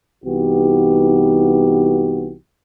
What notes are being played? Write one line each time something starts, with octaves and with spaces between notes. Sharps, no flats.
C2 E3 B3 D#4 F#4 G4